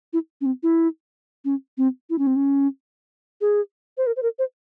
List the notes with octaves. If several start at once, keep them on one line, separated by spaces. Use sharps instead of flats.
E4
C#4
C4
E4
C#4
C4
E4
C#4
C4
C#4
G#4
C5
A#4
C5
A#4
C5